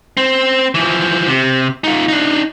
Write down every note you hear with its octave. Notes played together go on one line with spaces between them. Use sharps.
C4
E3 F3
C3
D#4 F4
D4 D#4